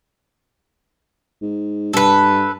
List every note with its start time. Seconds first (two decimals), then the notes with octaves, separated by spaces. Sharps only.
1.41 G#2
1.93 G2 A4 B4